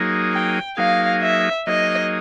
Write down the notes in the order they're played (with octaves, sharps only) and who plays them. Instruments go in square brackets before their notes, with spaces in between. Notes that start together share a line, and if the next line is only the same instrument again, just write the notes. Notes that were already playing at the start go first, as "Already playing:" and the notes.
Already playing: [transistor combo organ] F#3 A#3 D#4 G#4
[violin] G5
[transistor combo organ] F#3 A#3 D#4 G#4 [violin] F5
[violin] E5
[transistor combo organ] F#3 A#3 D#4 G#4 [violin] D#5